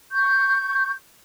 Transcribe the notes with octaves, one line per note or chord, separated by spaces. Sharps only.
C#6 G6